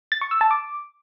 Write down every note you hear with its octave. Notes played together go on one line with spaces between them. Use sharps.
A6
C#6
E6
A5
D6